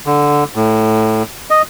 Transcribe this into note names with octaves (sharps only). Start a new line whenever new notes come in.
D3
A2
D#5